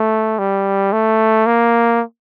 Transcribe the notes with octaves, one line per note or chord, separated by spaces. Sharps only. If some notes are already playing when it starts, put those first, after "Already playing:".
Already playing: A3
G3
A3
A#3